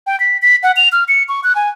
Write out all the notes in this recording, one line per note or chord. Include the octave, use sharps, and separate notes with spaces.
G5
B6
B6
F#5
F7
F6
C#7
C#6
F#6
G#5